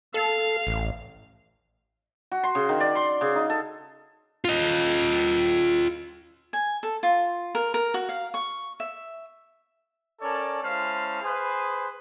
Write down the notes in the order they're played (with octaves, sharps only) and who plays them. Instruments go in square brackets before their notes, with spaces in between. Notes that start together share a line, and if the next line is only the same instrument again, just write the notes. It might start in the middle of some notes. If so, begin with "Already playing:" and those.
[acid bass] A4 [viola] F5
[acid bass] A1
[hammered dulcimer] F#4
C6
C#3
D#3
D5
C6
C#3
D#4
A4
[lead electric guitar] F4 D#5
[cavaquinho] G#5
A4
F4
A#4
A#4
F#4
F5
C#6
E5
[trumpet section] C#4 A4 A#4 C#5 D5 A5
G#3 C#4 E4 C5 F5 A5
G#4 B4 C5